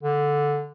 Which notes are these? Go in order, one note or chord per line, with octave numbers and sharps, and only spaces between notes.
D3